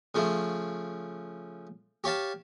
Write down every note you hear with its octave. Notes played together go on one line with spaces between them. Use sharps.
C#3 F3 A3
G4 C#5 F5 A5